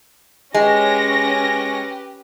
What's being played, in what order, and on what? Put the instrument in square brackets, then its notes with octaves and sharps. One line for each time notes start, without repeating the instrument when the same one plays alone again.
[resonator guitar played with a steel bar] G#3 [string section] C#4 A#6 [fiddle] G4 B4